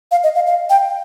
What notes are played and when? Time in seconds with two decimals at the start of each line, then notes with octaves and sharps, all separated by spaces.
0.11 F5
0.24 D#5
0.35 F5
0.47 F5
0.70 G5